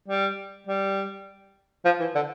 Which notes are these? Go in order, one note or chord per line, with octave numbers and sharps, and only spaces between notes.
G3
G3
F3
E3
D3